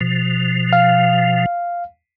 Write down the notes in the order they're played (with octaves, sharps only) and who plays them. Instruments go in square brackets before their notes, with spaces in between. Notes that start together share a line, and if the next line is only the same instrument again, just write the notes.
[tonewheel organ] B2 F3
[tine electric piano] F5